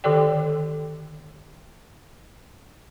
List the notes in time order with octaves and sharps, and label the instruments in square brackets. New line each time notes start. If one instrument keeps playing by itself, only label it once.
[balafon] D3 D#3 G4 A4 D5 G5